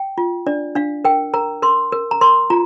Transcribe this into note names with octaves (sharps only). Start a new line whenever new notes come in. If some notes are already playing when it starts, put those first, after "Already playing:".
Already playing: G5
F4
D4 D5
D4 F5
A#4 G5
A#4 A#5
A#4 C6
A#4
A#5
A#4 C6
F4 A#5